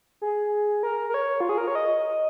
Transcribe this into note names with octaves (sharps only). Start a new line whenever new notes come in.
G#4
A#4
A#4
C#5
F4
G#4
A#4
C#5
D#5